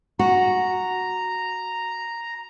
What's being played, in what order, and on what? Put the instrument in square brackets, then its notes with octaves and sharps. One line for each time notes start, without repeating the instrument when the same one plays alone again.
[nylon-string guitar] F#4 [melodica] A#5